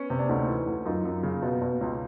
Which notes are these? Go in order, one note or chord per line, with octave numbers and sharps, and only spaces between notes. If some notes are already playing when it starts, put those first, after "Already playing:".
Already playing: B3 C#4
C3
D4
D2 C#4 D#4
E3
D2
F#2 D#4 F4
F#2
C#3
B2
B2
C#2